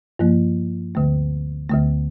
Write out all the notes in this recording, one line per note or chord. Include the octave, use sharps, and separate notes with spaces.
G2 F3 A#3
D2 D3 A3
D2 D3 A3